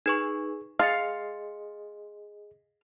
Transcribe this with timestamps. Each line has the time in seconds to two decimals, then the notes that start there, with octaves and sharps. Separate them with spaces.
0.06 D#4 G#4 B4 C#6
0.79 G#4 D#5 F5 C6 A6 C#7